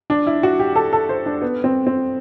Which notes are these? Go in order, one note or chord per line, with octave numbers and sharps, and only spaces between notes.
D4
E4
F#4
G4
A4
A4
C5
D4
B3
C4
C4